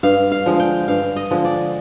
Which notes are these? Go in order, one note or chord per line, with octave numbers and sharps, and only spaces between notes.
G2 F5
F5
D3 F3 G#3
G5
G2 F5
D#5
D3 F3 G#3
D5